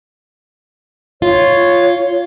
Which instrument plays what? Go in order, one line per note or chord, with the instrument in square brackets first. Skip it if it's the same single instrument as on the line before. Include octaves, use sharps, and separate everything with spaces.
[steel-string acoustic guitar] F4 [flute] C#5